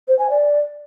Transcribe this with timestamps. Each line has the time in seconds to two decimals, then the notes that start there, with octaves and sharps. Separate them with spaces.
0.08 C5
0.19 G#5
0.30 D5